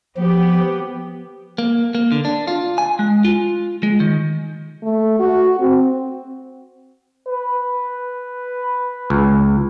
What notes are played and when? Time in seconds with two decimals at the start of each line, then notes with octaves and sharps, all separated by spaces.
0.17 F3 B3 G4
1.58 A#3
1.95 A#3
2.12 D3
2.25 D4
2.47 F4
2.78 G#5
2.99 G#3
3.25 F4
3.83 G#3
4.00 D#3
4.83 A3
5.19 F#4
5.60 C4
7.28 B4
9.10 C#2